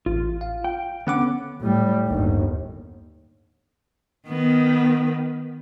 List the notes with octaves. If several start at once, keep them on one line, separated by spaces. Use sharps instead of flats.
A1 F4
F5
G5
D3 B3 C#4 F#5 D6
A2 G3
G1 D#2
D#3 B3